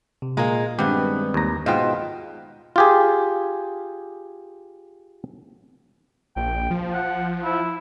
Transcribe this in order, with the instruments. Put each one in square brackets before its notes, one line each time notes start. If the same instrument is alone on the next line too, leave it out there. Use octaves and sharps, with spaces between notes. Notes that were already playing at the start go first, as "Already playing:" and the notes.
[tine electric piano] C3
[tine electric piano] A#2 A#5 [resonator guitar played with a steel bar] G#3 A#3
[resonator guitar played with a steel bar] G2 B3 [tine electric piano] D#3 G#3 C4 [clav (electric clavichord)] G4
[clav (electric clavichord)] D#2 A#5
[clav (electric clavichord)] G#2 F4 [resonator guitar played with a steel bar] B2 G5 [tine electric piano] D#5
[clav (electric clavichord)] F4 G4 G#4
[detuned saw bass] A#1 [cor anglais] G5
[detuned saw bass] F3
[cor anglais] F#5
E4